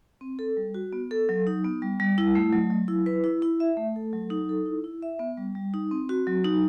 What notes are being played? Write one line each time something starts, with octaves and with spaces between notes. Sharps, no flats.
C4
A4
G3
F#4
B3
A4
F#3
D#4
B3
G3
G3
E4
A3
F#3
F#3
E4
B4
E4
E4
E5
A3
A4
F#3
D#4
A4
E4
E4
E5
B3
G3
G3
D#4
C4
F#4
F#3
D#4